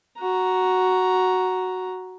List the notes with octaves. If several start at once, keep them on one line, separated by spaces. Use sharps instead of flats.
F#4 A#5